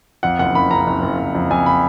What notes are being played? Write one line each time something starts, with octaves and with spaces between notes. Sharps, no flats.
F2 F#5
F#1 F#5
F#1 B5
F#1 A#5
F#1
F#1
F#1
F2
F2 G#5
B5